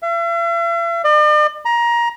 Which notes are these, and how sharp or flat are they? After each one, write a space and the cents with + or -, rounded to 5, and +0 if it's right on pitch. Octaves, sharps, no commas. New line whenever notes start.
E5 +45
D5 +45
A#5 +20